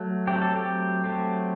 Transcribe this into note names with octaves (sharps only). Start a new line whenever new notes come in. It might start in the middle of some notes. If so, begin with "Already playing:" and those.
Already playing: F#3 A3
F#3 A3 C4 G4
A4
G4
F#3 A3 C4